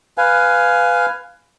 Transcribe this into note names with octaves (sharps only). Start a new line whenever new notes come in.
B4 F5 G#5